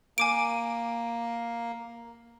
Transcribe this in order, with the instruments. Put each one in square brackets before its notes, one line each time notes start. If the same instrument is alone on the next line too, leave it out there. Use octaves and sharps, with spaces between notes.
[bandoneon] A#3 [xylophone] G#5 D6 D7